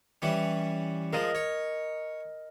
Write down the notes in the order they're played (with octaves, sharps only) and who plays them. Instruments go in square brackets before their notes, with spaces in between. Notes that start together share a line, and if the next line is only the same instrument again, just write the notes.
[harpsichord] E3 G3 C#4
[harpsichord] F3 G#3 [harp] A#4 D#5
[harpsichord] C#5